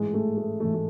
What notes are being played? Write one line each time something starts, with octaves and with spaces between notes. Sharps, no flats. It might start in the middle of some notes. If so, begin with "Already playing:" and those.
Already playing: A1 G#2 E3 G#3
A3
A3
A1 G#2 E3 A3
A3